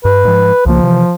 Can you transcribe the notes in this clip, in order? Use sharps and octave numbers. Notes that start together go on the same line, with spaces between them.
G2 B4
G#2 F3
C2 C#3 F3 A#3
C3 E3